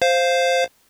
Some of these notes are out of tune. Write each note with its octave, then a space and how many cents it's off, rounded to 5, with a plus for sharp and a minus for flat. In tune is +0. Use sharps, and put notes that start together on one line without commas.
C5 +0 F5 +0